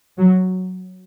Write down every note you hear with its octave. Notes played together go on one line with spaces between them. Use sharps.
F#3